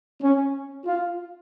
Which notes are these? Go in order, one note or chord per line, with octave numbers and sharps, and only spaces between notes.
C#4
F4